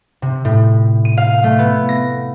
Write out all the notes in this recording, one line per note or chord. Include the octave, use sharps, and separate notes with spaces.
C3
A2
D#7
F5
A3
B3
A#6